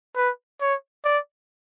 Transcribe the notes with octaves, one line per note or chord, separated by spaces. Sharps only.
B4
C#5
D5